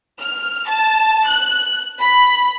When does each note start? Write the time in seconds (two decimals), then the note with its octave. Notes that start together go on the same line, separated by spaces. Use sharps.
0.21 F6
0.69 A5
1.27 F#6
2.00 B5